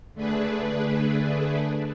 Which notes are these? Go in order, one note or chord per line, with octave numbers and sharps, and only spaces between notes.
D3 A3 D4 G#4 B4